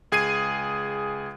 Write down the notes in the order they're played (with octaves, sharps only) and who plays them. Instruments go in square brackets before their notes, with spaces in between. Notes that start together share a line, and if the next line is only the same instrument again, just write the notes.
[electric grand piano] C#2 G#4 G#6 C7 D#7